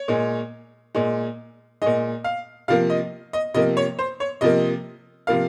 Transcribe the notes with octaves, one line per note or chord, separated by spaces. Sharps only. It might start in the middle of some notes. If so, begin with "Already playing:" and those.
Already playing: C#5
A#2 G#3
A#2 G#3
A#2 G#3 D#5
F5
C3 F3 A#3 F5
D#5
D#5
C3 F3 A#3 D#5
C#5
C5
C#5
C3 F3 A#3 D#5
C3 F3 A#3 F5